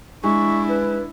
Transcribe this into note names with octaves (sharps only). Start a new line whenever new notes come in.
G#3 D4 E4 C#6
B4